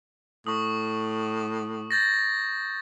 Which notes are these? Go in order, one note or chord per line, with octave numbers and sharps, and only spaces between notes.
A2 C#6 D#6
G6 A6 A#6